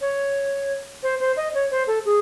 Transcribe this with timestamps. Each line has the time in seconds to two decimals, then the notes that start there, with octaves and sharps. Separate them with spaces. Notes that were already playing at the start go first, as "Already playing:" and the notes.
0.01 C#5
1.03 C5
1.20 C5
1.37 D#5
1.54 C#5
1.71 C5
1.87 A4
2.05 G#4